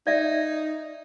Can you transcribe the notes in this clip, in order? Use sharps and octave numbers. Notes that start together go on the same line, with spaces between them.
D#4 D5 E5